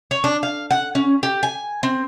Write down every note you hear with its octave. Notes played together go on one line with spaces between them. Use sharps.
C#5
D4
F5
F#5
C#4
G4
G#5
C4